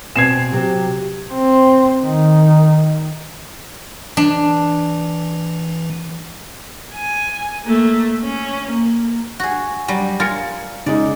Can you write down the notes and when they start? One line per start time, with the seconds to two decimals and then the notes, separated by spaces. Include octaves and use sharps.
0.16 B2 C4 G#5 G#6 C7 E7
0.53 C3 F#3 G4
1.33 C4
2.04 D#3
4.17 E3 D4
6.94 G#5
7.65 A3 A#3
8.24 C#4
8.72 A#3
9.40 F#4 G#4
9.88 F#3 G3
10.20 F4 A#4 G#5 A6 C#7
10.86 C#3 G#3 D#4 D5